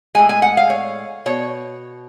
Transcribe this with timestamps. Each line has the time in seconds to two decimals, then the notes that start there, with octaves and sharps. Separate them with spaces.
0.15 A2 G#3 G#5
0.29 G#5
0.42 F#5
0.57 F5
0.70 C#5
1.26 B2 C#5